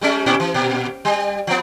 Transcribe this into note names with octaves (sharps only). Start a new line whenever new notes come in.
G3 G#3 C#4
A#2 C#4 E4
E3
A#2
G3
F3 B3